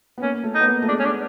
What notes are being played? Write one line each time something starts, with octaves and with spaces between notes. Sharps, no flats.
B3
A#3 C#4
A3
D#4
B3
A#3
A3
G#3 D4
C#4
D4